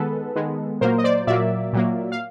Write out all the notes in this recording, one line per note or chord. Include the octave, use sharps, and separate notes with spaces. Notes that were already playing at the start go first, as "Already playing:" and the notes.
Already playing: D#3 G#3 B3 A4 B4
D#3 G#3 B3
A#2 F#3 A#3 A#4 C5
D#5
C5 D5
A#2 F#3 A#3 D5 E5
A#2 F#3 A#3
F5